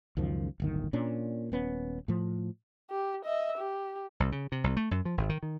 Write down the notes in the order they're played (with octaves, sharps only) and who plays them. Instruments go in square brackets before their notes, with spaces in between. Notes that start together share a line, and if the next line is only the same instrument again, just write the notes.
[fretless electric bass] C#2 F#2 D#3 F3
D1 G1 D#3
A#2 C#4 D4
D#1 B3 C#4
A2 F3
[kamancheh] G4
D#5 E5
G4
[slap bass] C2
C#3
C3
C2
A3
F#2
F3
G#1
D#3
D#3